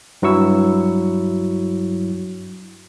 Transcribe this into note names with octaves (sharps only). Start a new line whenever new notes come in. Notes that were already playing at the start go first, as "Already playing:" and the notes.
G2 F#3 E4 C#6 E6